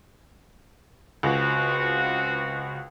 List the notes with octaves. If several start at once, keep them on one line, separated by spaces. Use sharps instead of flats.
C#2 C4 F4 F#4